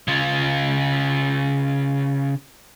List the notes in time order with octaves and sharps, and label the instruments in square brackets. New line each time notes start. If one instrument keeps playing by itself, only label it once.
[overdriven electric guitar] C#3 F4